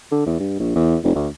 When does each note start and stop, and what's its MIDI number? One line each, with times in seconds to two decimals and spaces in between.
0.12 0.25 50
0.26 0.35 40
0.40 0.58 43
0.60 0.73 34
0.75 0.97 40
1.04 1.13 29
1.15 1.28 38